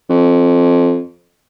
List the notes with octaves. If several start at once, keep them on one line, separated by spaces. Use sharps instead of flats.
F2